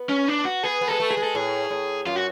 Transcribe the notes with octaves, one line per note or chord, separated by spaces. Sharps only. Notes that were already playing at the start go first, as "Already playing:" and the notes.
Already playing: B3
C#4
D4
F#4
B3 G#4
B3
G#3 A4
A3
G#4
G#3
A4
A2 G#4
A2
F#2 F4
F#4